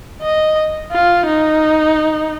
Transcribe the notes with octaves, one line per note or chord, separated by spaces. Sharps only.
D#5
F4
D#4